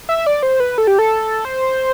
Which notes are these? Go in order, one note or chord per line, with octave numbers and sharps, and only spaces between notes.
E5
D5
C5
B4
A4
G4
A4
C5